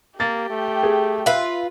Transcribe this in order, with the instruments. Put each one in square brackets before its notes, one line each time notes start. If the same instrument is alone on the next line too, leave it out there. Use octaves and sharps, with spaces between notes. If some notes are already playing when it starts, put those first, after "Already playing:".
[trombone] A#3 [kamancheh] G4 G5 [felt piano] A6
[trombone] A3
[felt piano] G#4
[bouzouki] F4 B4 [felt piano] E5